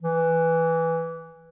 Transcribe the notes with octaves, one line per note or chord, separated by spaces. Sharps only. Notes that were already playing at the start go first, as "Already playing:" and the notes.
E3